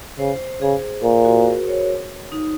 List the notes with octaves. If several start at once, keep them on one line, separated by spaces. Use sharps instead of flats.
C#3 C5
C#3 G#4
A#2
F#4
A#4
C#5
D#4